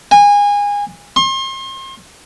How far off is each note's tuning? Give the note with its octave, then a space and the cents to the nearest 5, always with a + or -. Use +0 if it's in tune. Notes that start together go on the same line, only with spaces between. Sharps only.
G#5 -25
C6 +35